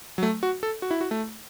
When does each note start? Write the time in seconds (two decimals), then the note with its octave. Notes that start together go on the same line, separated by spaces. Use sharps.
0.18 F#3
0.23 A3
0.43 F#4
0.63 A4
0.82 F#4
0.91 E4
1.01 F#4
1.11 A3